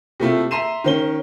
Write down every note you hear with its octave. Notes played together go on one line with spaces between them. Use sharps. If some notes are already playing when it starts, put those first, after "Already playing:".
C3 A3 E4 F4
E5 A#5 C6 C7 D#7 E7
D#3 C#4 G7